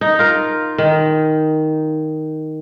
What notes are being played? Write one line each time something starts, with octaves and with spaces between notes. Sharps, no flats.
D#4
F4 A#4
D#3